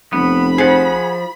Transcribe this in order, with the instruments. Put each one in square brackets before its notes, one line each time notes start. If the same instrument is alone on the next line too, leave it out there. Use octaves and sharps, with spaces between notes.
[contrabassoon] F1 [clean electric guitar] B3 [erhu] B5
[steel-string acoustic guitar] F3 [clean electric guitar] G#4 F#5